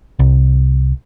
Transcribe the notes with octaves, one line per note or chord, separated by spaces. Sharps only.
C2